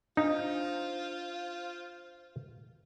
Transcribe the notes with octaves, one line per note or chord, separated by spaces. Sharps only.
D4 D#4 F4 C5 F5